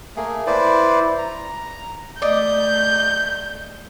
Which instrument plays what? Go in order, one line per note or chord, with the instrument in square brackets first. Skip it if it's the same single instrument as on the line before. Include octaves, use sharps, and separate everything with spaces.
[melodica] A3 A#3 G#4
E4 B4 C5 D5
A#5
[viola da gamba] A3 [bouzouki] D5 D#5 [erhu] G6